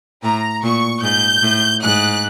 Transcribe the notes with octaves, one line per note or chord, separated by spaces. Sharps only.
A2 A#5
A#2 C#6
G#2 G6
A2
G#2 F#6